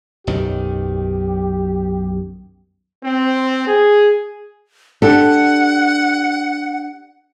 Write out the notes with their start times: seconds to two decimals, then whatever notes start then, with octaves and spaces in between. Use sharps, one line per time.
0.27 B1 F#2 D#3 G4
3.04 C4
3.68 G#4
5.02 D4 G4 A4 F#5